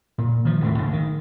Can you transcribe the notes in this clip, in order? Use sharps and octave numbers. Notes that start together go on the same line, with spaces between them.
A#2
D#3 F3
D#1 A2 A3
G#1 D3
D#3